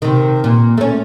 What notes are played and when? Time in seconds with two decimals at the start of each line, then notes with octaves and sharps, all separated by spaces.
0.02 C3 D#3
0.44 A#2
0.77 A3 C#4